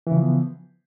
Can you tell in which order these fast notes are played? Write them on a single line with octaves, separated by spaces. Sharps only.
E3 C#3 F3 B3